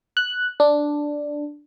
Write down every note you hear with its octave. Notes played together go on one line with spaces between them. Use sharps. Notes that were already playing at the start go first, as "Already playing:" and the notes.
F#6
D4